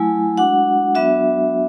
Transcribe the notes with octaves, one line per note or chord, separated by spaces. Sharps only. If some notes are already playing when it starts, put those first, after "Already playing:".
Already playing: F#3 A3 E4 G#5
G#3 D4 F#4 F#5
F#3 B3 D4 F#4 E5